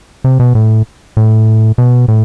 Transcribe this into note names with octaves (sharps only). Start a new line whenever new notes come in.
C3
B2
A2
A2
B2
A2